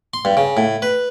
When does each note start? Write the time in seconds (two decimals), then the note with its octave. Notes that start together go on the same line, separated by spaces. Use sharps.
0.14 C6
0.25 G2
0.37 C#3
0.57 A2
0.82 B4